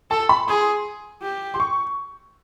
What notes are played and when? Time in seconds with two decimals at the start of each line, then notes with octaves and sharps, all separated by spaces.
0.11 A4 A5
0.29 B5
0.47 G#4 C6
1.22 G4
1.54 C6
1.60 C#6